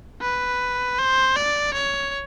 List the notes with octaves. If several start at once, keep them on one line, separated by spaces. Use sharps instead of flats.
B4
C5
D5
C#5